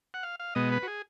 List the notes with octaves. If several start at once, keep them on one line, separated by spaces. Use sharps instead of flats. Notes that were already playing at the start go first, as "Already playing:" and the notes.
F#5
F5
F5
B2 G#3 B3 D#5
B4
F#4
G#4